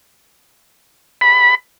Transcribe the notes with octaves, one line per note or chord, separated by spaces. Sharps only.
B5